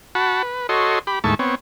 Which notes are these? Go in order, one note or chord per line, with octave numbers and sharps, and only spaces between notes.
F#4 F#5 A5 B5
B4
F#4 A4 C#5 D#5 C6
G4 B5
D#2 A2 G#3 E5 A5 C#6
B3 C4 C#5